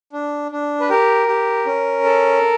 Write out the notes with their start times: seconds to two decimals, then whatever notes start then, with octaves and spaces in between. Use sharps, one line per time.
0.13 D4
0.52 D4
0.80 B4
0.90 G4 A#4
1.28 G4
1.66 C#4
2.04 A4